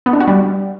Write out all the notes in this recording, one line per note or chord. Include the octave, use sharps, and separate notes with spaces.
B3
D4
F#4
G3